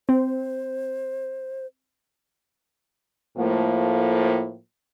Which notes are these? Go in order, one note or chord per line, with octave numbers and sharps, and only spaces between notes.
C4 C5
A2 F3 A3 A#3